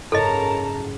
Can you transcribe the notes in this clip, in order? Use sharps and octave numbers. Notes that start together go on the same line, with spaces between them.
F#1 G#2 A4 A#4 C#5 D#5 A5 A#5